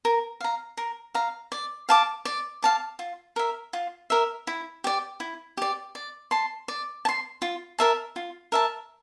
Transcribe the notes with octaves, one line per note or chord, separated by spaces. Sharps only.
A#4
F5 A#5
A#4
F5 A#5
D5
F5 A5 D6
D5
F5 A5 D6
F4
A#4 E5
F4
A#4 E5
E4
G4 D5
E4
G4 D5
D5
A5 C6
D5
A5
C6
F4
A#4 E5 A5
F4
A#4 E5 A5